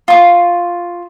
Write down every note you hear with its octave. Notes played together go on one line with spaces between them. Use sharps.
F4 C#6